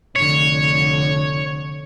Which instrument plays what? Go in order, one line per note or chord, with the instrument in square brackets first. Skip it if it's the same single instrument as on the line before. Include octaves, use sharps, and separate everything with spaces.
[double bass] F1 D3 [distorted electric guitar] C#5